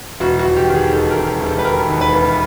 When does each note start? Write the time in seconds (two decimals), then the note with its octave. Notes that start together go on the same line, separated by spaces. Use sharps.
0.20 E1 F#4
0.39 F#4
0.45 E1
0.57 G4
0.69 D#3
0.75 G#4
0.92 D#2 A4
1.10 A#4
1.16 E1
1.29 G#4
1.40 E1
1.46 A4
1.59 B4
1.65 D#3 A#4
1.89 D#2
2.01 B4
2.13 E1